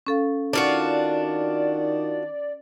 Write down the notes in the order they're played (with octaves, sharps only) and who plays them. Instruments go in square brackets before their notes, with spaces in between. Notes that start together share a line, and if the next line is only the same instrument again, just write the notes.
[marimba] C#4 A4 F5
[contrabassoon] D#3 [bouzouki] D4 F4 F#4 [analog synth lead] D5